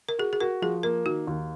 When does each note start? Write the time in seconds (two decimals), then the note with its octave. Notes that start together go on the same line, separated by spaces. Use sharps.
0.09 A#4
0.19 F#4 G#4
0.33 G#4
0.40 F#4 A#4
0.62 F3 G#4
0.83 A#3 A#4
1.06 D#3 F#4
1.27 D#2